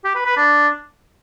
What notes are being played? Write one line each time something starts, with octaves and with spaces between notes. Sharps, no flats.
G4
B4
B4
D4